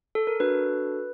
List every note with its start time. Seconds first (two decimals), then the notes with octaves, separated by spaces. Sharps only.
0.15 A4
0.27 A#4
0.40 D4 F#4 A4 B4